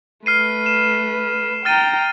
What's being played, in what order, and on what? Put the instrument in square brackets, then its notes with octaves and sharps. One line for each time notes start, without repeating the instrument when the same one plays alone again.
[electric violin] A3 B4 [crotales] F6 C7 D#7
[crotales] E7
[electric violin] G5 A#5 [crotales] F6 A6 D#7